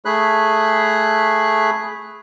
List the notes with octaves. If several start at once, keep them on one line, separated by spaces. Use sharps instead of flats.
A3 G#4 B5 F#6